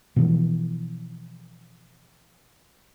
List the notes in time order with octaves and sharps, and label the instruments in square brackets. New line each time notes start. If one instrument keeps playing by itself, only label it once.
[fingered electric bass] B2 E3 F3